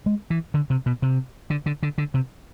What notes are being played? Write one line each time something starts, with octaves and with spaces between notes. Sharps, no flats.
G#3
E3
D3
C3
B2
C3
D3
D3
D3
D3
C3